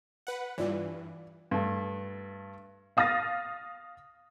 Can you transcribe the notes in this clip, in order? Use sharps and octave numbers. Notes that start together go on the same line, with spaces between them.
B4 F#5
G2 E3 F4 D5
G2 A3
F5 D#6 F6 A6 A#6